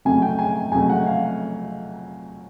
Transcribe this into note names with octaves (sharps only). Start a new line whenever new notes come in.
F2 C#3 F#3 A3 G#5
G5
G#5
F2 C#3 F#3 A3 G#5
F#5
F5